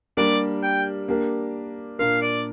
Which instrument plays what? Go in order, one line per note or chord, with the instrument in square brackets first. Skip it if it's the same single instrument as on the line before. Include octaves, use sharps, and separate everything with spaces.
[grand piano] G3 A#3 D4 G4 A#4 [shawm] D5
[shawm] G5
[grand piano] A#3 D4 G4 A#4
[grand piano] A#2 A#3 D4 A#4 [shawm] F5
[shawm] D5